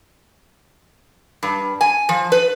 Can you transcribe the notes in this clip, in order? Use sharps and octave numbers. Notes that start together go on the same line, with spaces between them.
G2
G#5
F3
B4